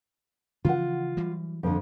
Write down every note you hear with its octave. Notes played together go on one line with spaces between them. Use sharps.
C#3 E3 F3 F4 F#5
E3 F#3 G3
F2 D3